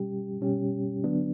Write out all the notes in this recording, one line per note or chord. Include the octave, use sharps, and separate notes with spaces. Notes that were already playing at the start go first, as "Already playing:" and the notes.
Already playing: B2 G3 C#4 G4
B2 G3 C#4 G4
D3 F#3 B3 D4